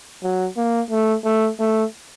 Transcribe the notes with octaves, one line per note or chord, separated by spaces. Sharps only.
F#3
A#3
A3
A3
A3